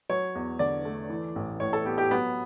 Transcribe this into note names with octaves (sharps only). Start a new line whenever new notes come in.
F#3 C#5
E2
D3 D5
A3
E3
A1
A2 C#5
A4
B3 G4
G4
F#3 B3